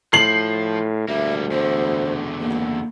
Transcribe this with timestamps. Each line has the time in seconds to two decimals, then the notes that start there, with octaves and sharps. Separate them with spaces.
0.13 A2 F3 C7 F#7
1.08 D2 G3 A#3 E5
1.51 E2 D3 C5
2.40 G#1 A#3